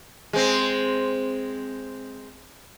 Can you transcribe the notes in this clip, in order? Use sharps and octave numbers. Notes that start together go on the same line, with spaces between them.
G#3 C4